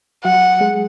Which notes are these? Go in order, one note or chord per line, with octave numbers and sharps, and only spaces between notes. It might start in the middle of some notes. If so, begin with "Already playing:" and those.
F#3 F#4 F#5
G#3 G#4